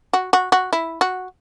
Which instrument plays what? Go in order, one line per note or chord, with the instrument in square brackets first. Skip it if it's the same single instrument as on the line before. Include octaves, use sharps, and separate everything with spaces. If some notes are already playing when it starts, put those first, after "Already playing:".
[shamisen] F#4
F#4
F#4
E4
F#4